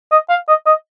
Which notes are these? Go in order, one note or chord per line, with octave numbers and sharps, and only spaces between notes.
D#5
F5
D#5
D#5